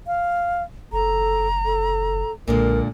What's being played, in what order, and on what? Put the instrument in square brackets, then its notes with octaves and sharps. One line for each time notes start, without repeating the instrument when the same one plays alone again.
[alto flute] F5
[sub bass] F#1 [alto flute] A4 [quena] A#5
[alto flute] A4
[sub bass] B1 [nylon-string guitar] A#2 D3 G#3 [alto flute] A#4